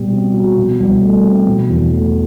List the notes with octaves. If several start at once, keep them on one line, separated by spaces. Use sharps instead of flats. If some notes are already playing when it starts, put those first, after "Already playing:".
Already playing: B2 G3 G4
C4
F#4
B2
C2
A3
C4
B2
E2
A3